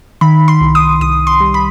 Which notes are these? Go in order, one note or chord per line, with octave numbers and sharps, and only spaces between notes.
D#3 B5
C6
C2
D#6
C2 D#6
C6
G3
B5